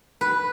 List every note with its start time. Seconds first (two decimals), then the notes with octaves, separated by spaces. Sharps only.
0.21 B4